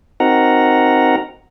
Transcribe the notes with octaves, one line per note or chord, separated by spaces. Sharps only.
C4 D#4 F#4 A#4 F#5 A#5